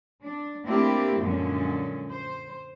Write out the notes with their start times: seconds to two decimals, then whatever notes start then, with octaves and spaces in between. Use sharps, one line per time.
0.22 D4
0.66 A3 A#3 C4 D4 E4 G4
1.20 F#2 A#2 D3 F3 G#3 C#4
2.11 C5